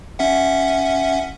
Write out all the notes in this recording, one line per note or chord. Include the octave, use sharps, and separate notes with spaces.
C#4 E5 F#5